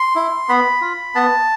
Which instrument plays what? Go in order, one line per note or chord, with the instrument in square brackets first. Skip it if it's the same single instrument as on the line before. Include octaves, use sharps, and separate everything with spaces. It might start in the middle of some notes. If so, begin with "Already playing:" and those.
Already playing: [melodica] C6
E4
B3 B5
F4
B3 A5